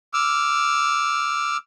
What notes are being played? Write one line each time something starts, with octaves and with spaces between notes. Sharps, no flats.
D6 E6 F6